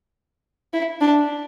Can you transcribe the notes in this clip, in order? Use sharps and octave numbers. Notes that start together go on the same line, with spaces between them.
E4
D4